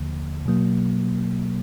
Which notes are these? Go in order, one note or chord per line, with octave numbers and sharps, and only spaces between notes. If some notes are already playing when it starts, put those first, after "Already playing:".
Already playing: D#2 D3 F3 A#3
B2 F#3 A#3